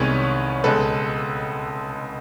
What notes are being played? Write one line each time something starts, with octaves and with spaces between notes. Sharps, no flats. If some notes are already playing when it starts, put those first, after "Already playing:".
Already playing: C2 C3 D#3 G#3 B3 B4 C#5
C#2 B2 G#3 A4 B4